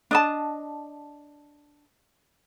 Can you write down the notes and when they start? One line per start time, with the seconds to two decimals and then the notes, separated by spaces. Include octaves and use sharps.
0.11 D4 D#5 A5